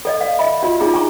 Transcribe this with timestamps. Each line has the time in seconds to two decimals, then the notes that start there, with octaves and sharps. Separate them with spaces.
0.05 A4 D5 D#5
0.21 F5
0.39 D#5 E5 B5
0.63 F4 F#4 D5
0.80 D4 D#4 F4 G#4 A#5
0.94 G#5 A#5 C#6